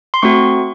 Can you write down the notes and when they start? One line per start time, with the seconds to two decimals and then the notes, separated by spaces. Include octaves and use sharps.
0.14 C6
0.22 A3 C4 F#4 C#6